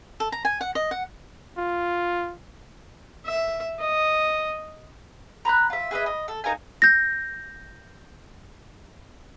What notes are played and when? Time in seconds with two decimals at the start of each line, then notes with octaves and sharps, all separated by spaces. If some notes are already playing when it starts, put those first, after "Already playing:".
0.20 A4
0.32 A#5
0.45 G#5
0.61 F#5
0.75 D#5
0.91 F#5
1.58 F4
3.26 E5
3.80 D#5
5.45 A#5 B5 E6 F#6
5.70 F4 E5
5.91 G#4 B4 D#5 E5
6.06 D#5
6.28 A4
6.44 D#4 A#4 F5 G#5
6.82 G6 A#6